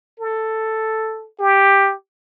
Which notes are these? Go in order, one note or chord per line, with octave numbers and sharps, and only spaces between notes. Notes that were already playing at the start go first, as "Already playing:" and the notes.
A4
G4